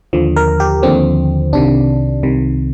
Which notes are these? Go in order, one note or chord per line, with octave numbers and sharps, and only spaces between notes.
D#2 D3 F3
A#4
G4
D#2 D3 F3 C4
C2 C3 D#3 D4
C2 C3 D#3